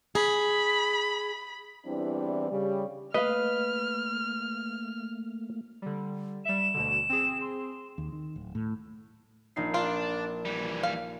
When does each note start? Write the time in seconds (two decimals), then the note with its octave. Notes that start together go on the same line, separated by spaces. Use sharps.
0.15 G#4 B5
1.85 E2 E3 G3 C4 D4 E4
2.51 C#3 G3
3.14 A3 A#3 B4 D#5 F5 F6
5.82 D3 G3
6.45 G3 E5 E7
6.74 D2 B2 D3
7.09 C4 G#4
7.41 C6
7.98 D#2
8.12 D#3
8.36 D1
8.55 A2
9.56 A#1 D#4 C7
9.74 D4 F4
10.45 E3 G3
10.83 F5